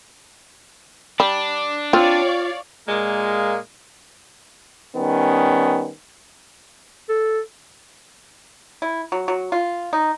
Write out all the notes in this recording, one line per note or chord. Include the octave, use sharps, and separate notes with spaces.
G3 D4
C4 F4 C#5 D5 F5
A#2 G#3 A#3
D#3 G3 B3 C#4
A4
E4
F#3
F#3
F4
D#4